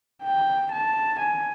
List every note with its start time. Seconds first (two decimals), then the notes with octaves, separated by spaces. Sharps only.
0.23 G5
0.72 A5
1.20 G#5